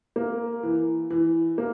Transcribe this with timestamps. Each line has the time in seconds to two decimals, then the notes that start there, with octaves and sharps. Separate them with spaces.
0.16 A#3
0.63 E3
1.10 E3
1.58 A#3